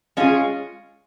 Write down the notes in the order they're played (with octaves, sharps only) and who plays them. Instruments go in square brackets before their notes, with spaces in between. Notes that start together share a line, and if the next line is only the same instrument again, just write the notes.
[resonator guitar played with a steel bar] G#3 C#4 F4 G#4